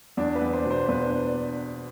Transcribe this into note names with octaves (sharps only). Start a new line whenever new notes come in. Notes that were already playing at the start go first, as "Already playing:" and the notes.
E2 D4
B4
E2
C5
B2
C5
E2 B4
D4